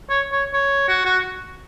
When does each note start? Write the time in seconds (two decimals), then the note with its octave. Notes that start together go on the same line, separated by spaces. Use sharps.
0.10 C#5
0.32 C#5
0.53 C#5
0.88 F#4
1.05 F#4